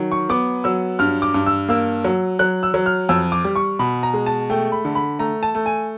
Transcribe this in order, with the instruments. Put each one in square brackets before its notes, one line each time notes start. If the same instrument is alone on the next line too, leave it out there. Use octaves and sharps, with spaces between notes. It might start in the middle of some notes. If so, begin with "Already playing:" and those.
Already playing: [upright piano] D#3 F#3
C#6
B3 D6
F#3 E6
G2 F6
D6
G2
E6
A#3 E6
F#3
F#3 F#6
E6
F#3
F6
F2 E6
D6
G3
C#6
B2 B5
A#5
G#3
A5
A3 G5
B5
D3
B5
A3 A#5
A5
A3
G#5